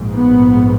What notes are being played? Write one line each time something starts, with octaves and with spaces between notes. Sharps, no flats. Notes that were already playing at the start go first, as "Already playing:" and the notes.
Already playing: A#1 G#2
B3